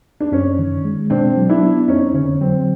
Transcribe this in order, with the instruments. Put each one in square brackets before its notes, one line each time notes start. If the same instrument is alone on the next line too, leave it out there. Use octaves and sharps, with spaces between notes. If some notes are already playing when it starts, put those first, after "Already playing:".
[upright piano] D4
[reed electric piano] F#2 [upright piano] C#4
[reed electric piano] D#3
G#3
[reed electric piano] B2 [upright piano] C4 D4
[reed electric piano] F#3
[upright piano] D4 E4
[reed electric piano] B3
[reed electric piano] F2 [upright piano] C#4 D#4
[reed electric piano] D3 [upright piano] C#4
[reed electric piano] F#3 [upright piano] C4